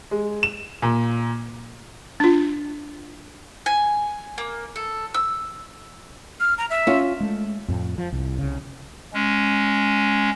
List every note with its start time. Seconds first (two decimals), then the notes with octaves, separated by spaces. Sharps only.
0.11 G#3
0.43 E7
0.82 A#2
2.20 D4 F4
3.66 G#5
4.38 A#3
4.76 A4
5.14 E6
6.40 F6
6.58 A#5
6.70 E5
6.87 C#4 F4
7.20 G#3 A3
7.68 F2 A2 A3
7.98 F3
8.12 C2
8.39 C2 C#3
9.14 G#3 C#4